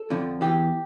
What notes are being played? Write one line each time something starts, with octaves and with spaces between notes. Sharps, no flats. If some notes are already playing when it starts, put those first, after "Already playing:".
Already playing: A4
F2 D3 F3
E2 E3 G4